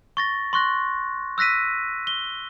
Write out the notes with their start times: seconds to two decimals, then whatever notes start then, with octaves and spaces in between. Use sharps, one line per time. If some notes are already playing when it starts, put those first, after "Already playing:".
0.17 C#6 A6 A#6
0.53 C6 C#6 F#6 A#6
1.38 E6 F#6 A#6 B6 D#7
2.07 G7